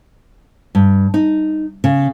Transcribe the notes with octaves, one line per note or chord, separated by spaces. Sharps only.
G2
D#4
C#3